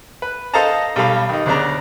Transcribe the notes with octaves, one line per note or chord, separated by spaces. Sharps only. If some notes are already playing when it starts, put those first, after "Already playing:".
B4
A4 C5 D#5 F5 A5 A#5
B1 G3 A4 F5 B5
D#3 D#4
D2 C#3 B3 D4 A#5